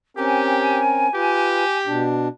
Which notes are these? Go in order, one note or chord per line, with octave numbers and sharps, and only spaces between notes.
C4 C#4 G4 A#4 G#5
F4 G4 B4
B2 D4